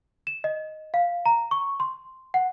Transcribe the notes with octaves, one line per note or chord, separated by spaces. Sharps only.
E7
D#5
F5
A#5
C#6
C6
F#5